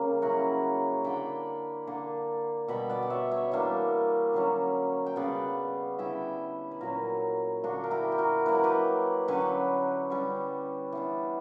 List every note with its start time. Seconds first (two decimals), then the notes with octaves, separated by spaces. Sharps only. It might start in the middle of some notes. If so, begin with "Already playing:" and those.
Already playing: C#3 G3 A#3
0.22 F#3 C#4 E4 F#5 A#5
1.04 D3 A#3 D4 G5 B5
1.87 D3 A#3 D4
2.68 B2 G3 B3 G5 B5
2.90 D5 F#5
3.03 F#5
3.10 C#5 E5
3.31 C#5 E5
3.52 E3 G3 A#3 D4
4.34 D3 F#3 C#4
5.06 G5
5.16 C#3 G3 B3 D5 F#5
5.99 D3 G3 C#4 E4 E5 G5
6.71 B4
6.81 A#2 F#3 C#4 F#4 A#4
7.64 D3 A#3 D4 F#4
7.84 A#4
7.91 E4 G4
8.12 G4
8.18 F#4 A#4
8.46 F#3 A#3 E4 B4
8.55 A#4
8.64 G4 B4
9.28 D3 F#3 C#4 G4 B4
10.10 D3 G3 C#4
10.92 E3 B3 D4